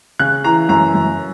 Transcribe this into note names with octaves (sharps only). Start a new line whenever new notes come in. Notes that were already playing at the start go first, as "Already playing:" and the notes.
C#3 F#6
E3 A#5
F#2 A#5
F#2